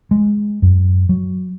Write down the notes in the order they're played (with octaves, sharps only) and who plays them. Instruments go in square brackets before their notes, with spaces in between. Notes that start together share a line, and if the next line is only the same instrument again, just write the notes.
[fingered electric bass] G#3
F#2
F#3